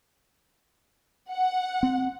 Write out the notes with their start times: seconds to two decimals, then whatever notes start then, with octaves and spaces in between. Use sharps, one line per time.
1.29 F#5
1.83 C4